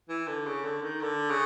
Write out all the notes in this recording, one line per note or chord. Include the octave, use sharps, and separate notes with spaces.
E3
D3
C#3
D3
D#3
D3
C#3